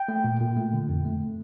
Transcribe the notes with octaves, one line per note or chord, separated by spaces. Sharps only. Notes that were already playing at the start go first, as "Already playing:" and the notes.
Already playing: G5
A3
A#2
A#2
A3
D3
F2
A3